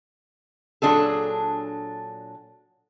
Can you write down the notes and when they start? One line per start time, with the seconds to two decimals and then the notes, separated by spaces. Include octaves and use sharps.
0.82 A#2 F#3 D4 G#4 A4